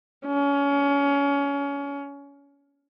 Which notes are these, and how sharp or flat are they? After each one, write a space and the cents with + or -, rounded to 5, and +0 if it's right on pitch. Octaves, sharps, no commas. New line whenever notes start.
C#4 +25